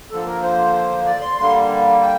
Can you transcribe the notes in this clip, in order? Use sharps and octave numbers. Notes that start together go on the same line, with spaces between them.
D3 F3 A#3 A4
A#4
C5
D5
C6
D3 G3 A#3 C6
G5